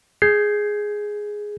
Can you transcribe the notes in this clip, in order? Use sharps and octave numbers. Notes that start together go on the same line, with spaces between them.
G#4 G6 G#6 C7